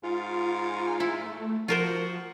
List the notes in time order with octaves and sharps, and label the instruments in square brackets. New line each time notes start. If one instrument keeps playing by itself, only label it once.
[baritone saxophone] G#2 [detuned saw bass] F4
[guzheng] E4
[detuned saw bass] A3
[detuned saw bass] F3 [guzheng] F4 A#4 C5 [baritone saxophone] F#4